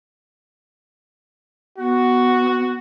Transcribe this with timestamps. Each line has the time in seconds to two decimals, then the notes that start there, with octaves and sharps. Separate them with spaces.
1.78 B3 F#4